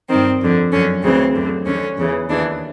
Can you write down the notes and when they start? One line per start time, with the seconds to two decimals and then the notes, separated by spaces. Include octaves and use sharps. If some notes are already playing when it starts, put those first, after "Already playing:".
0.09 G2 D#3 C4
0.40 F2 D3
0.72 F#2 D3 C#4
1.03 D2 C#3 E3 C4
1.35 F#2 D3
1.65 D#2 D3 C#4
1.97 E2 C#3 E3
2.29 D#2 C#3 E3 D4